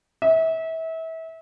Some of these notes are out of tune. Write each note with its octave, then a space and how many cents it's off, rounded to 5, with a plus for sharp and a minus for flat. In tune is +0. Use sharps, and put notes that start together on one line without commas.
E5 -30